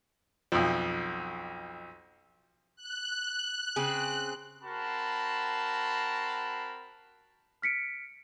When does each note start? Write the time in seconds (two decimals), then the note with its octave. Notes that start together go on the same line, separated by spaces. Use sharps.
0.52 B1 F2
2.76 F#6
3.76 C#3 C4 G#4
4.63 C4 F#4 A#4 A5 B5 C6
7.62 F6 B6 C#7 D7